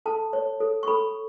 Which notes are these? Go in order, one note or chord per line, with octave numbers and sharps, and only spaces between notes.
A4 A5
C#5
A4
C#6
A4 B5